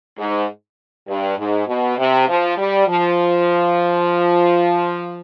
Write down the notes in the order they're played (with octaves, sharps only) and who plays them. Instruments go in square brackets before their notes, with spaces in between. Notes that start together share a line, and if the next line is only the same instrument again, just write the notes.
[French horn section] G#2
G2
G#2
B2
C3
F3
G3
F3